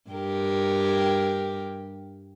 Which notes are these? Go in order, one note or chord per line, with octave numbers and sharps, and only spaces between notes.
G2 G4 A#4